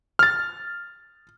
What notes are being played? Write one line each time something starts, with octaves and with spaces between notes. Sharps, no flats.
F6 A6